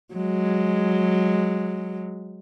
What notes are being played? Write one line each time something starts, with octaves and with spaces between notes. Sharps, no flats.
F#3 G#3